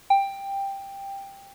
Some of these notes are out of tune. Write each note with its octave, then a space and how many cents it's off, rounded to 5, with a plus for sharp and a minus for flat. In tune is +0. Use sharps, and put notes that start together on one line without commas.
G5 +10